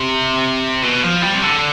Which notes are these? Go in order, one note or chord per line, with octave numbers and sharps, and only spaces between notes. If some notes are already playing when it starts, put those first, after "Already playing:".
Already playing: C3
B2
F3
G3
C3
D3